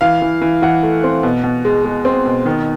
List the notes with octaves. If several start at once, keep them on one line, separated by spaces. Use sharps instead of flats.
E3 F5
E3
E3
E3 F#5
A3
C4
B2
B2
G#3
G#3
C4
B2
D#3